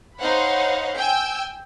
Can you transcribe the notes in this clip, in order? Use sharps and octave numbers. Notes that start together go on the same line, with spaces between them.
D#4 C5 C#5 F5 F#5 B5
G5 G#5 E6